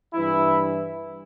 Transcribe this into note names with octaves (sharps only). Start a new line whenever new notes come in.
G2 E3 E4